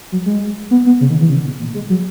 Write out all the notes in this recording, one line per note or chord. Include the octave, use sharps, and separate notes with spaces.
F#3
G#3
B3
B3
C#3
D#3
E3
C#3
B2
A#2
G#3
F#3